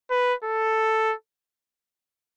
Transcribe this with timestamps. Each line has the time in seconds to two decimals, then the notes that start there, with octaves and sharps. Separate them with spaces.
0.11 B4
0.44 A4